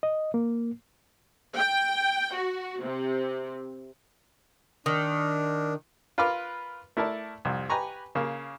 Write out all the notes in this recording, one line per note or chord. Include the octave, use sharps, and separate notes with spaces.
D#5
A#3
G5
F#4
C3
D#3 D4
F4 A#4 B4 F5 D6 F6
A3 E4 A#4 D5 A5
C2 F2
G4 B4 G#5 A#5 C#6
C#3 A#3